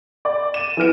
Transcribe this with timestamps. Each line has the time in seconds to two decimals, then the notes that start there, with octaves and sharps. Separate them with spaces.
0.25 D5
0.54 D#7 E7
0.77 E3 B3 F6 D7